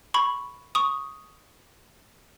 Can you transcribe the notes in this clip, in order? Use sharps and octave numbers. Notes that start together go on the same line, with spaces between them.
B5 C#6
C#6 D#6